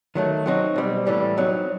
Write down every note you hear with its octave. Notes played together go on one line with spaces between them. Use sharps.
D#3 F#3 A3
F#3 C4 D#4 F#4
B2 G3 C4
A2 E3 G3
F#3 C4 D#4